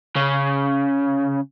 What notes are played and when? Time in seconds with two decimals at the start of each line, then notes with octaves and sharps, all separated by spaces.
0.16 C#3